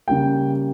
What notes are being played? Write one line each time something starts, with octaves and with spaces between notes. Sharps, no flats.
C#3 G3 A#3 G5